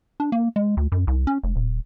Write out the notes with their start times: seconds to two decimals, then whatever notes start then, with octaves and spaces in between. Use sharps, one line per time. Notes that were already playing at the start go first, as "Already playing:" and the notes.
0.20 D4
0.32 A#3
0.56 G#3
0.77 D2
0.92 F#2
1.07 C2
1.27 C#4
1.43 F1
1.56 D#1